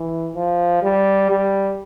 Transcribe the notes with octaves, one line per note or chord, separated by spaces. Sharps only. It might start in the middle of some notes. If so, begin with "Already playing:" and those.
Already playing: E3
F3
G3
G3